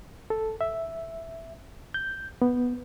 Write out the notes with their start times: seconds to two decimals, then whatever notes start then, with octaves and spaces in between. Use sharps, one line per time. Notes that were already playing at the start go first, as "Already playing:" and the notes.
0.30 A4
0.61 E5
1.94 G6
2.42 B3